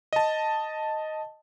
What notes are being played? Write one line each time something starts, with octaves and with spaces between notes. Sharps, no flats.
D#5 A5